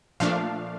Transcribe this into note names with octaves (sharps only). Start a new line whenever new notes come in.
A#2 F3 A3 D4 F5